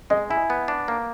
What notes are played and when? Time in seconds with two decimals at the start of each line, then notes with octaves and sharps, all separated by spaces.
0.10 G#3 D#5
0.30 E4 G#5
0.50 B3
0.68 D4
0.88 A#3